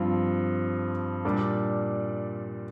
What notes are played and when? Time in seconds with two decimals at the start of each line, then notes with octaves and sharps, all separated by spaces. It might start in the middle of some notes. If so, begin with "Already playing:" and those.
Already playing: G2 F3 C4 F4
1.25 A#2 G3 D4